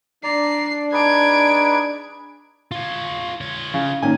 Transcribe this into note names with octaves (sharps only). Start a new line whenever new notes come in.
D4 D5 A#5 C7
D#4 G#4 B4 G#6 D7
F4 C#5
F4 C#5
C#3
D#3 A#3 C#4 G#5